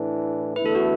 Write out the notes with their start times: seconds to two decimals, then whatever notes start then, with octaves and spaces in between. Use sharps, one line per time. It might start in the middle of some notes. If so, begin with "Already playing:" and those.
Already playing: A2 E3 D4
0.56 E2 D3 A3 E4 B4
0.66 A4
0.75 F#4